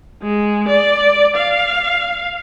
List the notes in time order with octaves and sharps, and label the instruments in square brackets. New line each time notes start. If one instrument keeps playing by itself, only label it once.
[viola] G#3
D5
F5